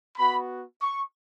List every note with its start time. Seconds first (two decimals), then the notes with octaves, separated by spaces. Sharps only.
0.18 B3 F#4 B5
0.82 C#6